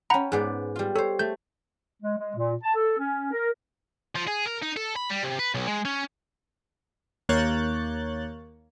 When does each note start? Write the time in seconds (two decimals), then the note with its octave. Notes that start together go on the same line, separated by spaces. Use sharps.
0.10 C#4 F#5 G5 A#5 B5
0.32 G#2 B3 D5
0.76 G3 F4
0.96 A4 C5 C#5
1.19 A3 G6
2.02 G#3
2.17 G#3
2.35 A#2
2.63 A5
2.75 A4
2.98 C#4
3.32 A#4
4.15 F3
4.27 G#4
4.46 A#4
4.62 D#4
4.76 A4
4.96 B5
5.10 G3
5.23 C3
5.39 B4
5.54 B1
5.67 G#3
5.85 C#4
7.29 D#2 A#3 C#5 F#6 G6 A6